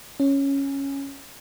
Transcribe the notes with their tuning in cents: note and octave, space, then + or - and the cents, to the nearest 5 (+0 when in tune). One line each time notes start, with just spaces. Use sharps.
C#4 -5